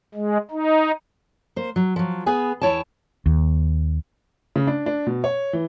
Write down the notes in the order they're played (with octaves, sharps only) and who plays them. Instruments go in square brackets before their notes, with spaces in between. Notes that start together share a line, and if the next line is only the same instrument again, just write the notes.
[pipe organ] G#3
D#4
[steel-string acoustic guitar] A#3 C5
F#3
F3 F#3
B3 G#4 B4 G#5
E2 E4 C#5 G5 A5
[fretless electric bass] D#2
[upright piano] C#3
D4
D4
B2
C#5
E3